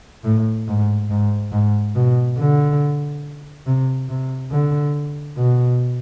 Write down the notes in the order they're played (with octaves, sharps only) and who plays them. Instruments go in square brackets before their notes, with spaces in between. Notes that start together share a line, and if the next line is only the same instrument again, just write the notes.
[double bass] A2
G#2
G#2
G#2
B2
D3
C3
C3
D3
B2